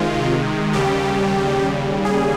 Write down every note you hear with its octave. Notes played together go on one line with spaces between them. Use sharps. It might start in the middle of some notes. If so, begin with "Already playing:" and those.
Already playing: C3 D#3 G#3 F4
D#2 C#3 G3 G4
G#4